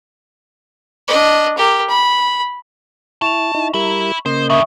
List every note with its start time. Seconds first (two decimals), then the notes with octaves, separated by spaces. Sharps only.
1.08 D4 D#5
1.57 G4 A#4
1.90 B5
3.22 E4 A5 C#6 E7 F7
3.54 D#4 E4
3.74 G3 E4 A#4 E5 B5
4.26 C#3 A#3 C5 D#5
4.50 D3 G3 E5 C#6 D#6